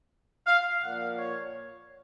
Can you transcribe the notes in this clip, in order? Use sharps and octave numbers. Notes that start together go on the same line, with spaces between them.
F5
A#2 F3 A#3 F#5
C#5